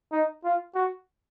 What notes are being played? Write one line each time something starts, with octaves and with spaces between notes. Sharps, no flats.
D#4
F4
F#4